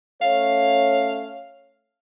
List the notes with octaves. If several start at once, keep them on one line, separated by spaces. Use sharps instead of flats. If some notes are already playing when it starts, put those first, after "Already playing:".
A3 C#4 C#5 F5